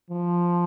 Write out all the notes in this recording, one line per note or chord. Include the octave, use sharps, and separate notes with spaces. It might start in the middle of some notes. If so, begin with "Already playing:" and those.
F3